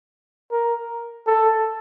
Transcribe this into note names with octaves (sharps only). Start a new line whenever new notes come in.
A#4
A4